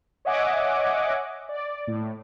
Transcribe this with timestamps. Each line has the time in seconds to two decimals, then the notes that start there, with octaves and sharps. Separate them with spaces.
0.25 C#5 D#5 E5 F#5 G#5 D6
1.49 D5
1.87 A2